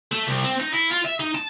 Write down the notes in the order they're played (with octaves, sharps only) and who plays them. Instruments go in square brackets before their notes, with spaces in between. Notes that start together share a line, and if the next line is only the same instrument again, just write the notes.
[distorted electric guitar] A3
C2
C4
D#4
E4
F4
E5
D#4
A5